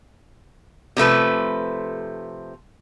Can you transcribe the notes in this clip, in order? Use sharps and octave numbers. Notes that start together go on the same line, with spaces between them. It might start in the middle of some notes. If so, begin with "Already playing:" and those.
C3 F3 A3 B4